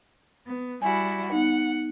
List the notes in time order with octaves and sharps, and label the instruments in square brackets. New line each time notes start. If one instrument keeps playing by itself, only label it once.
[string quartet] B3
[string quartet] G3 E4 F#4 [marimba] G#5
[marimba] B3 D#4 [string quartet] F#5